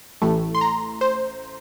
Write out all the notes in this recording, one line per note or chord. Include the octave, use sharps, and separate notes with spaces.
A1 A2 A3
C6
A#5
C5